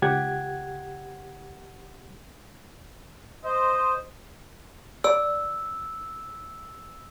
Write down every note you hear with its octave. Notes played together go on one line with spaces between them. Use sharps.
C#2 G4 F#5 G#6
C5 D#5
D5 E6